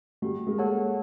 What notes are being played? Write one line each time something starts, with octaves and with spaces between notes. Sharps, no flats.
G3 A3 F#4
G#3 A#3
A4 C#5 F#5 A5